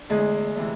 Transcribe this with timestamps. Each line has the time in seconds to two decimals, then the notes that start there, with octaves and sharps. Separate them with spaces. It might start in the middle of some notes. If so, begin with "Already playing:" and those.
Already playing: D4
0.09 E2 D3 G#3 A3 E4 G#4
0.56 C3 E3 A3